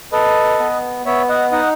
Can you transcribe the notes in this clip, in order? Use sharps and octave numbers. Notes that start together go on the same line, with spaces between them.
A4 B4 D#5
B3
B3 C#5 E5
D#5 F#5
D#4 D#5 F#5